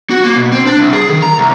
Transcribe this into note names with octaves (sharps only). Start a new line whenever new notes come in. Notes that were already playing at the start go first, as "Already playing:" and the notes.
F#4
A#3
B2
C4
D4
C2
G#4
D#3
A#5
C2